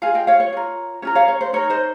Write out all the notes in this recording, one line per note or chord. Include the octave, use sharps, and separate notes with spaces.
F4 G#4 F5 G#5
D#5 G5
C#5 F5
C#5
F4 A#4
C#4 F4 A#4 C#5
C#5 F5
C#5
C5
D#4 A#4 C#5
C5 D#5